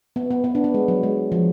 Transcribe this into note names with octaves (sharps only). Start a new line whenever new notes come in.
B3
B3
B3
D4
B3
G#3
F#3
G#3
F3